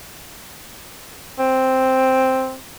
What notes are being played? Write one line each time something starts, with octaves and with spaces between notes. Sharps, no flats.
C4